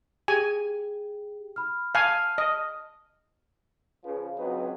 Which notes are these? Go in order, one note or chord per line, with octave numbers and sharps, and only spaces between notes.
G4 G#4 G5 G#5
B5 F6
F5 G#5 A5 F6
D#5
C#3 F3 B4
C#2 F#3 C4 D#4 F#4 B4